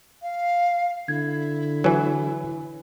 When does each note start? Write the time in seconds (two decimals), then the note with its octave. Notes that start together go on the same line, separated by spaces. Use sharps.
0.22 F5
1.08 D3 E4 G#6
1.84 E3 F#3 B4 C#5 G#5